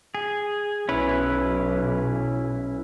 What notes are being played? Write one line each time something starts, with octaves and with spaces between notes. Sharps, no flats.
G#4
B1 C#4 E4 B4